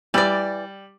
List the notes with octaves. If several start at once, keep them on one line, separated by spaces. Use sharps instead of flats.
E3 G3 D5